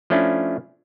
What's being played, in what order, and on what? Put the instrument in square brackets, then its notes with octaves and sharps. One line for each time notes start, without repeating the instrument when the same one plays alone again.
[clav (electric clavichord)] F3 A3 C#4 D4 E4